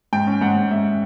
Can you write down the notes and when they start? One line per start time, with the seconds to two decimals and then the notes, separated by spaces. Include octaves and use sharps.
0.13 G#2 G5
0.27 C#4
0.41 G#2 F#5
0.56 G#2
0.71 G#2 E5